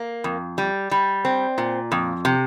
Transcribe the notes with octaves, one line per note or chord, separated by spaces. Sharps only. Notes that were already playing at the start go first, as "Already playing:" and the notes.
Already playing: A#3
F2
G3
G3
C4
A#2
F2
C3